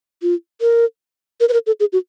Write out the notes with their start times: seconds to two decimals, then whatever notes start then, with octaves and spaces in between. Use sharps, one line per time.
0.22 F4
0.61 A#4
1.40 A#4
1.49 B4
1.53 A#4
1.67 A4
1.80 G#4
1.93 F#4